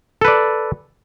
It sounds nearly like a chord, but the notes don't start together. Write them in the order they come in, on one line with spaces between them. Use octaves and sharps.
A4 B4 D5